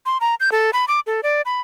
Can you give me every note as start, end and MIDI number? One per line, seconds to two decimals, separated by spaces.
0.06 0.18 84
0.21 0.35 82
0.40 0.50 91
0.52 0.71 69
0.73 0.85 83
0.88 1.00 86
1.07 1.21 69
1.23 1.42 74
1.46 1.61 83